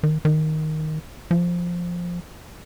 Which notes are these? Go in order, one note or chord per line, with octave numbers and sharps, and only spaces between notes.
D#3
D#3
F3